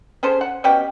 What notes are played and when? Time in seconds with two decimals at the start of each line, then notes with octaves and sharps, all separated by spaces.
0.23 C#4 G#4 A4 C5
0.41 F#5
0.64 B2 C#4 G4 G5